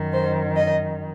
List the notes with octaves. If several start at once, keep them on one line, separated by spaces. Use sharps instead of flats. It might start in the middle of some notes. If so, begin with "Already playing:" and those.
Already playing: F#2 D#3
C5
D#5